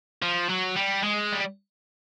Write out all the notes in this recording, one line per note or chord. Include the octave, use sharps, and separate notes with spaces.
F3
F#3
G3
G#3
G3